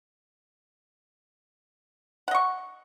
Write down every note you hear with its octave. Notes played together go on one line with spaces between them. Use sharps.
D#5 F#5 C#6